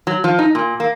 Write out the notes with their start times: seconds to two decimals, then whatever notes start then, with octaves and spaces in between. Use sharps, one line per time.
0.07 F#3
0.24 F3
0.39 D#4
0.55 A#2
0.80 A#3